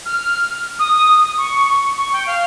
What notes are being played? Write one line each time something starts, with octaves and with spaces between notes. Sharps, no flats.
F6
D#6
C#6
C#6
G5
F5